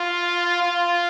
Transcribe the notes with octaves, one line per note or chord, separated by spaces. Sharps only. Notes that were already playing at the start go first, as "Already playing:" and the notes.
Already playing: F4
F4